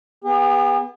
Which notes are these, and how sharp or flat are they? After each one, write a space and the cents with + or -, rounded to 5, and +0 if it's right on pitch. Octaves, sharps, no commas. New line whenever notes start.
B3 -15 G#4 -45